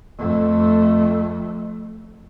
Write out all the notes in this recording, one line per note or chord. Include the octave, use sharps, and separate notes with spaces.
F2 A3